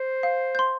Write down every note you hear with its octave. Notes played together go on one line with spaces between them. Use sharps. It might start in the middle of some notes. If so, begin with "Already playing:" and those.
Already playing: C5
F5
C6 G6